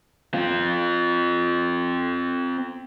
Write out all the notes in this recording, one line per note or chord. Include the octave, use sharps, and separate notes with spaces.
C4 F4